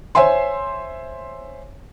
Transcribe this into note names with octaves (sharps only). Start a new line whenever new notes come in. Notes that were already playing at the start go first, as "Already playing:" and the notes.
C5 C#5 E5 G#5 C6